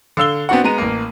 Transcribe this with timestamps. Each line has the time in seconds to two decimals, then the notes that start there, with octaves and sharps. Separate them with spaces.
0.17 D3 F5 E6 G7
0.49 B3 C4 D4 F#4 F#5
0.64 G#3 B3 A#5 D#7
0.78 A1 A#3